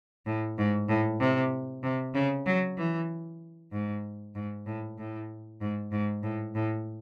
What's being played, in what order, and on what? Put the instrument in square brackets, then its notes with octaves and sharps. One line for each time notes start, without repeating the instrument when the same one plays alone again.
[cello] A2
G#2
A2
C3
C3
C#3
F#3
E3
G#2
G#2
A2
A2
G#2
G#2
A2
A2